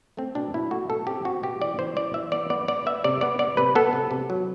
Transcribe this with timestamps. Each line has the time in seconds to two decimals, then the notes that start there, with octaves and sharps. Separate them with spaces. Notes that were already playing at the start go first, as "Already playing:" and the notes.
0.17 A3 C4
0.35 B2 D4
0.54 B2 E4
0.71 A3 F#4
0.90 B2 A4
1.07 C4 G4
1.25 C4 F#4
1.43 B2 G4
1.61 E3 D5
1.79 E3 C5
1.97 E3 D5
2.14 E3 E5
2.32 B3 D5
2.50 B3 D5
2.68 B3 D5
2.86 B3 E5
3.04 C3 D5
3.21 B3 D5
3.39 B3 D5
3.57 C3 B4
3.75 B3 A4
3.93 C3
4.11 C3
4.30 F#3